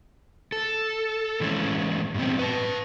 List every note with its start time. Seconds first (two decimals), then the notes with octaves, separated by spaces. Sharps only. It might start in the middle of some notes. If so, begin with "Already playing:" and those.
0.52 A4
1.40 A2 E3 G#3 C#4 E4
2.14 G2 B2 C4
2.39 B4 A5